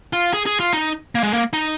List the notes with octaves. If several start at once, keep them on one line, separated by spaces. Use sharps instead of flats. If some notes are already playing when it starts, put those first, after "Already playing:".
F4
G#4
G#4
F4
D#4
A#3
G#3
A#3
D#4